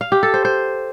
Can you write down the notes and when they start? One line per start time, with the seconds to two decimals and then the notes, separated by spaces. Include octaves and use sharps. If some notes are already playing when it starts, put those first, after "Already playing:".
0.01 F5
0.12 G4
0.23 A4
0.34 C5
0.45 C5